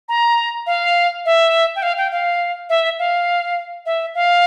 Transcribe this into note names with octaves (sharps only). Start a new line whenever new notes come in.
A#5
F5
E5
G5
F5
G5
F5
E5
F5
E5
F5